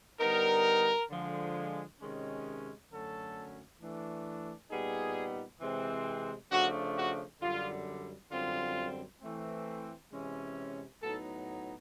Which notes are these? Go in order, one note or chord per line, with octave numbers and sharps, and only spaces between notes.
D3 G3 B3 D#4 A#4
D3 F3 G#3
C3 D#3 G#3 C#4
F#2 D3 F#3 A3 C#4 A4
E3 A3 D4
A#2 G3 B3 D#4 G#4
C3 E3 G#3 C4
C#3 F3 A3 D4 F#4
F#4
F#2 D3 G3 F4
F#2 D3 G3 C4 F4
E3 A3 C4
C3 E3 G#3 C#4
A2 F#3 B3 D#4 A4